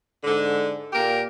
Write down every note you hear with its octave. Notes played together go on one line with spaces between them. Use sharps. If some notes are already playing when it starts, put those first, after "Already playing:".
G#2 D3
A#2 A#3 G4 A#4